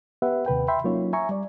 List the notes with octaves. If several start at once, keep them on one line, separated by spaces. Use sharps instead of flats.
B3 G4 B4 E5 F#5
D#2 C3 B4 G5
E5 G5 B5 C6
F#3 A#3 C#4 D#4 F4 C#5
E5 G#5 A#5 C#6
G3 D5